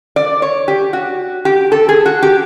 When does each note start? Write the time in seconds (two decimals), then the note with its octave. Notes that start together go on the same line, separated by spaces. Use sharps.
0.16 D5
0.42 C#5
0.68 G4
0.93 F#4
1.45 G4
1.72 A4
1.89 G#4
2.06 F#4
2.22 G4